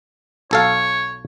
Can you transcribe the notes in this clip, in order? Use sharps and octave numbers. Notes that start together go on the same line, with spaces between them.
B1 A4 C#5 F5